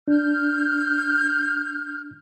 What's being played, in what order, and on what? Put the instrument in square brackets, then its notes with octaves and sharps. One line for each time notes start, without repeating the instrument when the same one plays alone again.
[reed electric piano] D4 [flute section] F6 G6